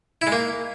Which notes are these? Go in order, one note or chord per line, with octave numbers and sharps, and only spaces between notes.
E4
G#3
A#3